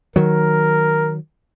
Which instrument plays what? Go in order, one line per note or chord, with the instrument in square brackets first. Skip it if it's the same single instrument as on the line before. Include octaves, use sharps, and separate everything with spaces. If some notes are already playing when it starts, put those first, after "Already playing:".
[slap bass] D#3 F#3 [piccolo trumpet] A#4